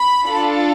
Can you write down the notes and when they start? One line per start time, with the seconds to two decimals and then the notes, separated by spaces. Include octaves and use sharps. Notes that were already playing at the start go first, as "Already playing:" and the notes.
Already playing: B5
0.25 D4 F4 A4